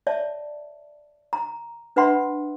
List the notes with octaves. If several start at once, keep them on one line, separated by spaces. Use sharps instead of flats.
C#5 D5 E5 A5
A#5
D4 B4 E5 F#5 B5 C6